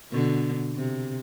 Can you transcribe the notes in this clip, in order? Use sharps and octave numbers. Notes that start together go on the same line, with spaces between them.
B2 D3
C3